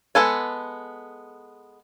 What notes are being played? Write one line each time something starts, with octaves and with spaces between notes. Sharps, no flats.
G#3 B3 A4 G#5